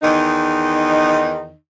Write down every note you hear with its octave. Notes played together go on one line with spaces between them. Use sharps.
E2 D#3 D#4